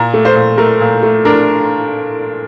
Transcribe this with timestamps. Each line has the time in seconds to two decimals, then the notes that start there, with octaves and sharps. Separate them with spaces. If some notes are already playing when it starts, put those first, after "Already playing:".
Already playing: A#2 A#5
0.14 A3
0.25 C5
0.35 A#2
0.57 A3 A#4
0.80 A#2
1.03 A3
1.25 D4 A#4